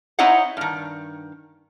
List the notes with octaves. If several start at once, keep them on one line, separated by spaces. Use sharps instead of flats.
C4 D#4 E4 C#5 D#5 F#5
G2 D#3